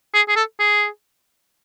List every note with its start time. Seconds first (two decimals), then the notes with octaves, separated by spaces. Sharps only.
0.14 G#4
0.29 G#4
0.36 A4
0.59 G#4